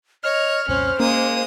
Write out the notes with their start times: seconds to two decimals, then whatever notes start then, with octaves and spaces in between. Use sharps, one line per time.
0.24 C#5 D#5 F6
0.68 C2 F2 A#2 C#4 C5
1.00 G#3 A#3 C#4 D#6